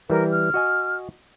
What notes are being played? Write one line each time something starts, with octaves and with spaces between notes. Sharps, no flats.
E3 G3 A#4
F6
F#4 D#5 G#5